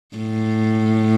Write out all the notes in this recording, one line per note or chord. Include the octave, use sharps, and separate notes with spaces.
A2